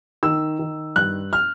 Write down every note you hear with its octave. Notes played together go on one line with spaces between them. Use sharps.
D#3 E6
D#3
G2 F#6
F6